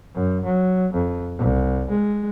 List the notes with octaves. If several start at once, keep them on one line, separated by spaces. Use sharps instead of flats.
F#2
F#3
F2
C2
G#3